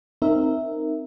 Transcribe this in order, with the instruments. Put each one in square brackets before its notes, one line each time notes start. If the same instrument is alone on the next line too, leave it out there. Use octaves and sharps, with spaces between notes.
[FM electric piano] C4 D#4 A#4 E5